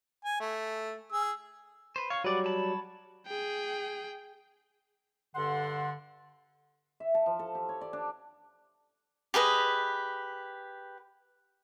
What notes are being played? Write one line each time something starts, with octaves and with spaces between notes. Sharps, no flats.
G#5
A3
G#4 E6
B4 C5
C#5 F5 C#6
F#3 G3 B4 D5 F#5
C#5 A5 B5
G#4 G5
G2 D3 A4 F#5 C6
E5
A5
F3
A4
G4
C#5
D5
D4
G4 G#4 B4 D#5